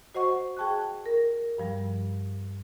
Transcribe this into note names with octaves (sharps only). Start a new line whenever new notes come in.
F#4 C5 D#5 F#5 C#6
G#4 G5 A5 C#6 F#6
A#4
G2 F3 G3